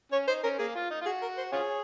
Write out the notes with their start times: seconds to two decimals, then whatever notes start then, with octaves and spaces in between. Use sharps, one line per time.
0.12 C#4 C#5
0.28 D#4 C5
0.44 C#4 A#4
0.59 A#3 G#4
0.75 F4
0.91 D#4
1.01 F4
1.05 F#4 G#4
1.22 A#4
1.37 C5
1.52 C#4 F4 G#4 C#5